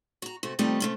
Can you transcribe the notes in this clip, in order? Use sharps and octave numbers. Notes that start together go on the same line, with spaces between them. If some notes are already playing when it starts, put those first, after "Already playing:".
F#4 A#5
C3 A3 F#4
D#3 F3 G3 A3 C4 D#4
C3 A3 C#4